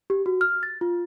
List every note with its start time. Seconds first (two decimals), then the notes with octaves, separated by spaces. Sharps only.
0.10 G4
0.26 F#4
0.41 F6
0.63 A6
0.81 F4